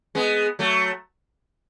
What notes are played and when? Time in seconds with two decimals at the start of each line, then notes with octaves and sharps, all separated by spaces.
0.15 G#3 B3
0.59 F#3 A3